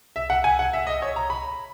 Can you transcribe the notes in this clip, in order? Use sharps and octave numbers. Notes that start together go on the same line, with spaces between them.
E5
F#5
G#5
F#5
E5
D#5
C#5
A#5
B5